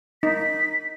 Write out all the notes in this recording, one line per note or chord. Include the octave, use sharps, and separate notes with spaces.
D#4 B6